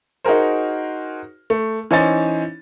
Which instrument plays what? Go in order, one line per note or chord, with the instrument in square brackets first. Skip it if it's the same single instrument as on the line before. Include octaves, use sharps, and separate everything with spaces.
[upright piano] D#4 F#4 G#4 A#4 C5
A3
E3 C#4 D#4 C5 G#5 A6